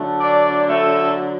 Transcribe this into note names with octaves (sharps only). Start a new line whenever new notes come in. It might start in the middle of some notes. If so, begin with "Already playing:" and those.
Already playing: D3 F#3 A3
D4 D5
A3 A4